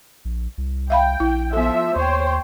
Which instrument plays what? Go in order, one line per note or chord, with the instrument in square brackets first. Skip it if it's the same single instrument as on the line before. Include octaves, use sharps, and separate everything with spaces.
[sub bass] A#1
C2
[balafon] E5 F5 B5 [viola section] G5
[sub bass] A#1 [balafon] E4
[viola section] F3 E5 [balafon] B3 A4
[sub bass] D#2 [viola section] C5 C#5 G5